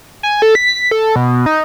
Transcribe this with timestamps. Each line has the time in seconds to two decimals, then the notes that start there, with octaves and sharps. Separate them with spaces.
0.23 G#5
0.42 A4
0.55 B6
0.91 A4
1.16 B2
1.46 D#4